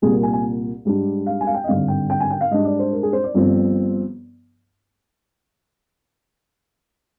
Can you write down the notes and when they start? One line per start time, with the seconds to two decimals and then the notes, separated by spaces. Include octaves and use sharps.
0.02 C2 A#2 G3 G#4
0.13 A#4
0.23 G#5
0.33 G#5
0.85 G#2 G3 D4
1.26 F5
1.41 G#5
1.47 F5
1.54 G5
1.64 D#5
1.68 G#1 G2 D3 F5
1.88 G5
2.10 G5
2.20 G#5
2.31 G5
2.41 F5
2.51 G#2 G3 D4 D#5
2.65 D5
2.79 C5
2.93 A#4
3.03 G#4
3.13 C5
3.24 D5
3.34 G1 G2 F3 C4